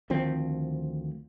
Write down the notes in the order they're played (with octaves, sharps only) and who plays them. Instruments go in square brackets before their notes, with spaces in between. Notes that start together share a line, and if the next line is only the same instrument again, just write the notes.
[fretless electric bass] D2 D#3 F3 C4